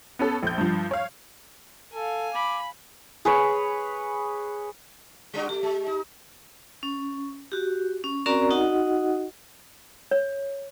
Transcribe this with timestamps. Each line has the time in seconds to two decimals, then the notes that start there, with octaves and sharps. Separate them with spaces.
0.19 B3 C#4 A4
0.43 A#1 G6
0.58 G2 F3
0.91 C#5 F5
1.93 A4 F5 G#5
2.34 B5 D6
3.25 G#4 B4 C#5
5.34 G3 D4 F#4
5.49 A3 G4
5.63 G#3
5.87 D#4
6.83 C#4
7.52 F#4 G4
8.04 C#4
8.26 C4 C#4 F#4 A#4 D5 A#5
8.51 D#4 F#4 D#5 F#5
10.11 C#5